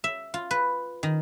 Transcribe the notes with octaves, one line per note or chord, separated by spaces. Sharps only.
E5
F4
B4
D#3